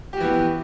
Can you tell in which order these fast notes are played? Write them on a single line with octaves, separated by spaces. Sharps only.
G4 F#4 E3 B3